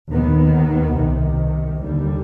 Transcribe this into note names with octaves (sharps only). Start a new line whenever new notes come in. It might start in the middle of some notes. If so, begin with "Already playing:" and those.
D#2 D#3 B3
C2 C3 D#3
D#2 D3 G3